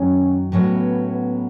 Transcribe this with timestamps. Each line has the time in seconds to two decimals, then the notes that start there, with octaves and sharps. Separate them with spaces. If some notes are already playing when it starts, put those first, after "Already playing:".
Already playing: F#2 D#3 F#3 C#4
0.52 A2 F#3 B3 C#4 E4
1.08 B3